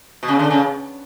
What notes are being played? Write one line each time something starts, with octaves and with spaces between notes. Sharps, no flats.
B2
C#3
D3
C#3